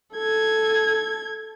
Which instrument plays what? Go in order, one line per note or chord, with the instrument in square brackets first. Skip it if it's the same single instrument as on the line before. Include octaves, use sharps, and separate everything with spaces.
[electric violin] A4 G#6